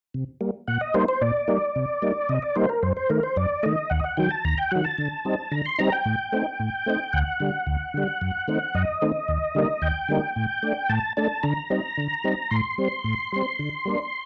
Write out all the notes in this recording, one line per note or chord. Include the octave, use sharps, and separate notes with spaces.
C3
G3 A#3
A#2 F#5
D#5
G3 A#3 D#4 C5
C5
A#2 D5
G3 A#3 D#4
C3
G3 A#3 D#4
C3 D#5
D5
G3 A#3 D#4 C5
A#4
F#2 C5
C5
D#3 A3 A#4
C5
F#2 D5
D#3 A3 D#5
D#2 F#5
D#5
F#5
D#3 F#3 G5
A5
D#2 A#5
G5
D#3 F#3 F#5
A5
D3
G3 C4 D#4
D3 A#5
C6
G3 C4 D#4 A#5
G5
A2
A3 C4 D#4
A2
A3 C4 D#4
D2 F#5
D3 G3
D2
D3 G3
F#2
D#3 A3 C4 D#4
F#2 D#5
D#3 A3 C4 D#4
D#2
D3 G3 A#3 D#4
D#2 G5
D3 G3 A#3 D#4
A2
A3 D4
A2 A5
A3 D4 A5
D3 A#5
G3 C4 D#4
D3
G3 C4 D#4
A2 C6
G3 C4
A2
G3 C4
D3
G3 A#3 D4